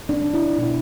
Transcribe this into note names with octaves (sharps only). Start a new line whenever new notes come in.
D4
A3 C#4
E4
B2 E4